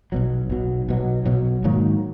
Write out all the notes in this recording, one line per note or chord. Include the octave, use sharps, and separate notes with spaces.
B1 B2 F#3
B1 B2 F#3
B1 B2 F#3
B1 B2 F#3
G#2 D#3 F#3 A#3